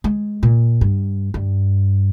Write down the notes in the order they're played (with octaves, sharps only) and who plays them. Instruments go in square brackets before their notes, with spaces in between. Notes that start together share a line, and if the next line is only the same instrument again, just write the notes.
[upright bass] G#3
A#2
G2
G2